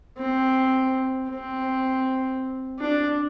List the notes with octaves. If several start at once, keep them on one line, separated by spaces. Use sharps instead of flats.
C4
C4
D4